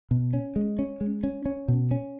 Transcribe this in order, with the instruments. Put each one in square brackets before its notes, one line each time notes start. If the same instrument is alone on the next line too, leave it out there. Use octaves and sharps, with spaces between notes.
[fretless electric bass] B2
C#4
G#3
C#4
G#3
C#4
C#4
B2
C#4